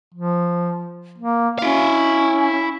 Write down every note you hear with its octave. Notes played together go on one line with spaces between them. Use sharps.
F3
A#3
C#4 E4 F5